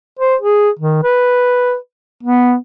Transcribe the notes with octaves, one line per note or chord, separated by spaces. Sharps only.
C5
G#4
D#3
B4
B3